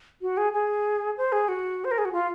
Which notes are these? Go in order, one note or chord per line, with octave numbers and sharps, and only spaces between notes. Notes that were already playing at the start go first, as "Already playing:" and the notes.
F#4
G#4
G#4
C5
G#4
F#4
C5
A#4
G#4
F#4
F4